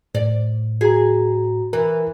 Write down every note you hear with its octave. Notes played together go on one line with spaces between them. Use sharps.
A2 D5
F#4 G#4 A#5
E3 A#4